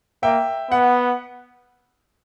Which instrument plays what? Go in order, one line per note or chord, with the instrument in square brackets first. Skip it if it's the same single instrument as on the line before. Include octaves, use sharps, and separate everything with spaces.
[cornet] A#3 [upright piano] E5 G5
[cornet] B3 [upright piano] F#5